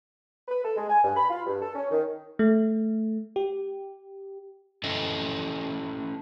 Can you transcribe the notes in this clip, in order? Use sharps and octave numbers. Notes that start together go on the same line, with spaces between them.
B4
A4
G#3
G#5
G2
B5
F4
G2
A4
C#4
D#3
A3
G4
C#4 E4 A4 D#5